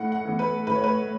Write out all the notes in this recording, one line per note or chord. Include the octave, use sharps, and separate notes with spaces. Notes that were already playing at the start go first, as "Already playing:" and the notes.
Already playing: A2 F#5
F#5
E3 B3
B4
A2 B4
C#5
B4